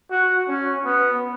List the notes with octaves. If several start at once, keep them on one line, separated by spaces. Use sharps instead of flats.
F#4
C#4
B3